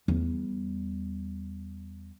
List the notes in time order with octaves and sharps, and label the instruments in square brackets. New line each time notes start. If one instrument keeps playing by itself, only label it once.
[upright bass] E2 G3